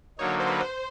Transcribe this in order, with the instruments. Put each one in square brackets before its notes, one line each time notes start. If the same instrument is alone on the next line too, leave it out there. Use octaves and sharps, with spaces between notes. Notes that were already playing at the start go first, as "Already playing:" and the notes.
[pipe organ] D3 F#3 A#3 D#4 [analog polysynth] C#5
[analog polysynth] C5
B4
C5